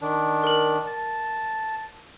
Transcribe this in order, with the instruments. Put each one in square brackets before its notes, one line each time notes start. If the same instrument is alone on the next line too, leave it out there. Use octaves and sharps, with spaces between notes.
[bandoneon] D#3 D4
[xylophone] A#4 F#7
[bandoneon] A5